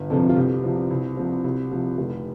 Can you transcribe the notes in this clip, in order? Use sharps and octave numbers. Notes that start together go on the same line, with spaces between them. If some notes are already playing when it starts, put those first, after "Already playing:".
Already playing: G1
F2 C3 F3 A4
F4
C2 G4
C3 F3
C2
C3 F3
C2 G4
C3 F3
F1